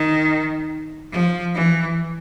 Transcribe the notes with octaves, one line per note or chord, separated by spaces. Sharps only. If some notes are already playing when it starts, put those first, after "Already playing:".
Already playing: D#3
F3
E3